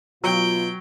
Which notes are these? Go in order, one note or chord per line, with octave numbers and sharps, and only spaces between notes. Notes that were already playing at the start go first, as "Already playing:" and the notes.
B2 F#3 F4 G5